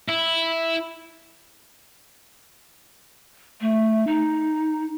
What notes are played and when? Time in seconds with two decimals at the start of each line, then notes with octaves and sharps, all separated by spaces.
0.09 E4
3.61 A3
4.07 D#4